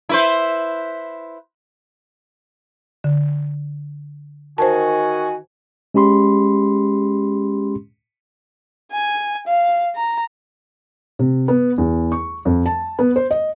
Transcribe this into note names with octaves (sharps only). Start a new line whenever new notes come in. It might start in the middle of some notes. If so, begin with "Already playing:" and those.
E4 B4 C5
D3
D#3 F#4 C5 G#5 A5
G#3 C#4 G4 B5 C6
G#5
F5
A#5
C3
B3
E2
C#6
F2
A5
B3
C5
D#5